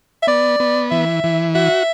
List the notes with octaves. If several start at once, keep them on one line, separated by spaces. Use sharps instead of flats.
E5
B3 D5
B3
E3 E5
E3
F#4 E5